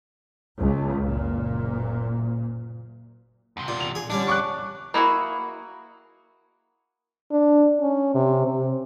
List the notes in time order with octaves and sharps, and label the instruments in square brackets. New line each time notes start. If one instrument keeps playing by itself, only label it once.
[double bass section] C#2
F#1 A#2
[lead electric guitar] E2 C3
[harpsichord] A#2
[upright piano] F7
[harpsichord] G#4
[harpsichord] D3 G3 C#4 [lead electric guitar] D4
[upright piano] C#6 D6 F#6
[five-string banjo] A#3 E4 F#4 G#4
[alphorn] D4
C#4
C3
C3